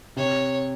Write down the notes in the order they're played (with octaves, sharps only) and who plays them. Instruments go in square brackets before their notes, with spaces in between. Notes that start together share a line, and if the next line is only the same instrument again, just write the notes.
[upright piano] C3 [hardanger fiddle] C#5